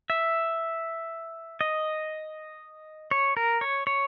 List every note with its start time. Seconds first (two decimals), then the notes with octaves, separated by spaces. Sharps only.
0.10 E5
1.61 D#5
3.11 C#5
3.37 A#4
3.61 C#5
3.87 C#5